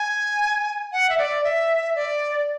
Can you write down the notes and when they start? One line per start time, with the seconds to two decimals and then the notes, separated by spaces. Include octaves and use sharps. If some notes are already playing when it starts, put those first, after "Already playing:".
Already playing: G#5
0.92 F#5
1.09 E5
1.18 D5
1.44 E5
1.96 D5